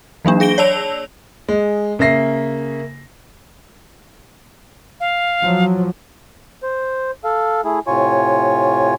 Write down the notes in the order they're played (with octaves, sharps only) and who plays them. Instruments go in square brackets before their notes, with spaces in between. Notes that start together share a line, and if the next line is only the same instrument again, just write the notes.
[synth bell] E3 F#3 A#3 D4
G#4 A#6 D7 G7
C#5 D5 A5 E6 F7
[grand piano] G#3
C#3 A#3 E5 A#6 C7
[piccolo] F5
[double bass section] F3 F#3
[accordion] C5
A4 F5
A3 E4 G#4
A2 C3 F4 C#5 G#5 C#6